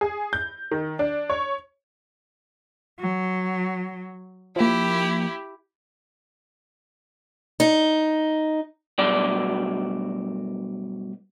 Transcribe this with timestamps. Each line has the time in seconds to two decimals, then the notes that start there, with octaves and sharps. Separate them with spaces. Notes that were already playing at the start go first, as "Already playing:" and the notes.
0.01 G#4
0.33 G6
0.71 D#3
0.99 D4
1.30 C#5
3.00 F#3
4.56 F3 A#3 E4 G4
7.60 D#4
8.98 G2 B2 F#3 F#4 D5